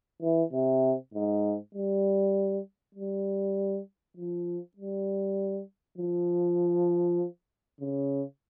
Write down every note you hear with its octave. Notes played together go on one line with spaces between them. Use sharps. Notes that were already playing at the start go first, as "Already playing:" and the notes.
E3
C3
G#2
G3
G3
F3
G3
F3
C#3